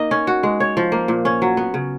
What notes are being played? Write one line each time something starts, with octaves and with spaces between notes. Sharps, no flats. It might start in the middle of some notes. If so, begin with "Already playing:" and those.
Already playing: A#3 D#4 D#5
C#4
F#4
G#3
C#5
F3
A#3
A#2
C#4
F#3
B3
C#3